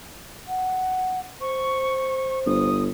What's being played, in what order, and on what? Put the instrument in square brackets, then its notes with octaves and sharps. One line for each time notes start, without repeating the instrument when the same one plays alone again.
[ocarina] F#5
[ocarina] C5 [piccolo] C#6
[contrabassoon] G1 [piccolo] D#6